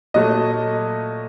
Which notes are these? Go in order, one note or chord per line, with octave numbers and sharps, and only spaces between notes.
A#2 F#3 A3 D#5